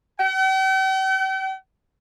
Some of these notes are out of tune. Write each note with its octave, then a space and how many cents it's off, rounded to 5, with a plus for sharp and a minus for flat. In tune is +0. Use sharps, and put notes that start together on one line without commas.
G5 -45